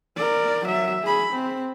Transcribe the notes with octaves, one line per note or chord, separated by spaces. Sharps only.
A#4 D5
F#3 E5
G#4 B5
C4